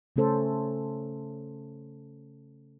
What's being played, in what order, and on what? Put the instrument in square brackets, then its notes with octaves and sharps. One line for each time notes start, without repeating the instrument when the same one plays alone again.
[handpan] C#3 A3 C#4 A4 C5